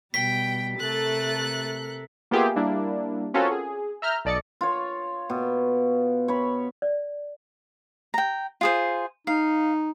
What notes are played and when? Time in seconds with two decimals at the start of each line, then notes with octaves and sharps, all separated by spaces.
0.14 B2 G3 G5 B6
0.80 C3 A3 A4 A#4 F#6 A6
2.31 A#3 B3 F4 G4 G#4 E5
2.56 G3 A#3 D4 E4
3.34 C4 C#4 F4 F#4 A4 A#4
3.52 G#4
4.02 E5 A#5 F6 G6
4.25 B1 A4 D5 D#5 A6 C#7
4.61 F4 C#5
5.30 B2
6.28 C#5 B5
6.82 D5
8.14 G5 A#5
8.61 F4 G#4 C5
9.27 D#4 F5